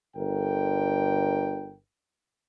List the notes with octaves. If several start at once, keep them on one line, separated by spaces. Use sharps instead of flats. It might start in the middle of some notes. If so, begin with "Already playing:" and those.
G1 D3 A#4 G5